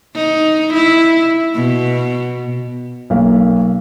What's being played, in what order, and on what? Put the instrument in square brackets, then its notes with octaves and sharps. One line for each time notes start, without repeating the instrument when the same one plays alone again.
[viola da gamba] D#4
E4
B2
[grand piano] B1 A#3 F5